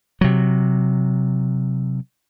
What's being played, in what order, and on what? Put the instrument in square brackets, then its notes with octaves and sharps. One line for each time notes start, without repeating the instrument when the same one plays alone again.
[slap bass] C3 F#3